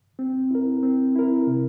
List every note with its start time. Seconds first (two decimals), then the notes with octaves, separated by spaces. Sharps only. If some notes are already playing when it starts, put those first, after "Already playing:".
0.19 C4
0.51 E4 A#4
0.83 C4
1.16 E4 A#4
1.47 C3